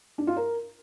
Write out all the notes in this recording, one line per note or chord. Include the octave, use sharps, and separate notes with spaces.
D4
F4
A#4